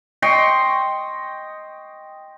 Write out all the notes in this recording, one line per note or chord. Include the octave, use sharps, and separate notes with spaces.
D#5 G5 C6 C#6